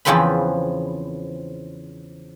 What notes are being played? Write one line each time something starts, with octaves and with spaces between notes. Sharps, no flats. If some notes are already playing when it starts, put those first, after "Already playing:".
E2 C#3 F3 C4 B4 B5